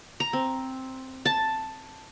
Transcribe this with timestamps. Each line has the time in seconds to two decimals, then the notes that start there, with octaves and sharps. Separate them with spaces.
0.20 A#5
0.33 C4
1.25 A5